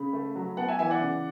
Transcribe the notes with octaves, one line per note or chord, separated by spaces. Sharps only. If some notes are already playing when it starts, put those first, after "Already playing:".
Already playing: C#3 B5
A3
F#3
B3 F#5 A5
E5 G#5
E3 E5 G#5
D5 F#5
C#3